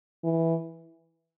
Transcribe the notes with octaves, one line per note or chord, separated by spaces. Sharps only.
E3